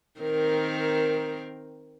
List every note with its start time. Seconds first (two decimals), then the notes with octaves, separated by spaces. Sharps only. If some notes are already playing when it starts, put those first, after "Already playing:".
0.19 D#3 C4 A#4